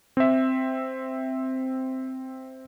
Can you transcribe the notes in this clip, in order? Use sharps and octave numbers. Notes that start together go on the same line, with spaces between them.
C4 E5